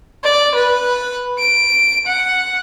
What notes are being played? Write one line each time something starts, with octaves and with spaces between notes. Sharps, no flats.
D5
B4
D7
F#5